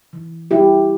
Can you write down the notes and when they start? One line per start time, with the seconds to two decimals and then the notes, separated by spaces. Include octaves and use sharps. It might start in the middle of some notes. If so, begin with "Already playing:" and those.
0.13 E3
0.51 G3 E4 G4